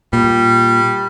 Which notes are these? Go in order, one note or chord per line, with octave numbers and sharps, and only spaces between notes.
A#2 G3